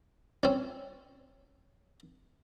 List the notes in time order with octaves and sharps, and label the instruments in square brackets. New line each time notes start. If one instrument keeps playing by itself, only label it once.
[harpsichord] C4 C#4